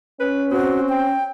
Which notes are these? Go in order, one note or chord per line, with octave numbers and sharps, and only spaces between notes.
C#4 B4
C4 F#4
G5